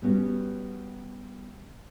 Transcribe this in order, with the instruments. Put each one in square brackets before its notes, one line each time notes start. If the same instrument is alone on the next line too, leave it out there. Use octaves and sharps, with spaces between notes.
[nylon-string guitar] G3 B3 C#4 F#4